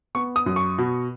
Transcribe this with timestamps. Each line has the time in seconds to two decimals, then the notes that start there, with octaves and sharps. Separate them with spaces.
0.15 B3 C#6
0.36 D#6
0.46 F#2
0.56 C#6
0.78 B2